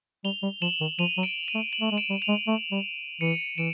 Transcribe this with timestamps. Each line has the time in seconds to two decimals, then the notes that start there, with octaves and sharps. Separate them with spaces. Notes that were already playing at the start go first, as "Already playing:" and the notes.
0.24 G3 F7 G7
0.43 G3
0.62 F3 E7 F#7
0.80 D#3
0.99 F3 D#7 F7
1.17 F#3
1.23 D7 E7
1.48 D#7 F7
1.55 A3
1.73 E7 F#7
1.81 A3
1.91 G#3
1.97 D7 E7
2.10 G3
2.22 D#7 F7
2.28 G#3
2.47 A3
2.71 G3
3.21 E3 C#7 D#7
3.58 E3 D7 E7